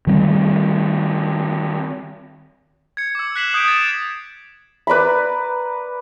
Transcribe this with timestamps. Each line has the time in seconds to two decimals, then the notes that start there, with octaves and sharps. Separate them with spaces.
0.07 D#3 G3 C4
2.97 G#6 C#7
3.15 D6 E6
3.36 F#6 G#6 B6 C7 E7 F#7
3.54 D#6 G6 G#6 B6 D7
3.68 A6 E7
4.87 B4 D5 A#5 B5